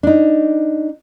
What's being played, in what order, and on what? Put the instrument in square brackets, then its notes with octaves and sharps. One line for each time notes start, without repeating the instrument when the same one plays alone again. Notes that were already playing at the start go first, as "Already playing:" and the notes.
[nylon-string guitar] D4 D#4